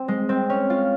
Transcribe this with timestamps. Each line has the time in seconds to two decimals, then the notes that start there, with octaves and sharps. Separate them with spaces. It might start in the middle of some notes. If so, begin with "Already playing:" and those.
Already playing: C4
0.08 G#3
0.29 C4
0.50 C#4
0.70 F4